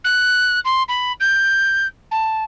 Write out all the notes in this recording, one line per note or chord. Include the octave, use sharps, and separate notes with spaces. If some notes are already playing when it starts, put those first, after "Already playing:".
F#6
C6
B5
G6
A5